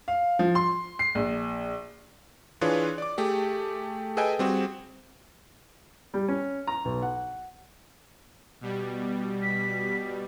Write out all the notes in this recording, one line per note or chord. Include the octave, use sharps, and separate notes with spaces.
F5
F3
C6
C7
A#1
E3 D4 F4 G#4 B4 C#5
D5 D6
A3 G4 G#4
G#4 A4 B4 D#5 G5 G#5
G3 C4 F#4 G#4
G3
C#4
A#5
B1
F#5
B2 G3
B6